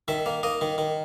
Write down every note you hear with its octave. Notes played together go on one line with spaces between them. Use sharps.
D#3 E5
A#3
A#3 D#5
D#3
D#3